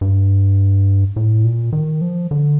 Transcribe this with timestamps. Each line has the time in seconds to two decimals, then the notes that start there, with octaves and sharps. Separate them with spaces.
0.01 G2
1.16 A2
1.45 A#2
1.73 D#3
2.01 F3
2.31 D3